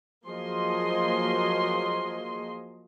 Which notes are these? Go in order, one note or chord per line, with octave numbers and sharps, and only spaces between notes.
F3 F#3 A#3 G#4 D#5 C6